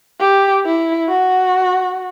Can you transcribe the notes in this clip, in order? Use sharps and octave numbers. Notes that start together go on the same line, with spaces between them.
G4
E4
F#4